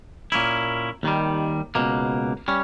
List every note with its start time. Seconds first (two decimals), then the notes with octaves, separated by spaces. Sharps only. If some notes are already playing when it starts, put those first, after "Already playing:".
0.32 A#2 A#3 C#4 E4
1.03 D#2 D#3 G3
1.75 C#2 B2 A#3
2.48 G3 C#4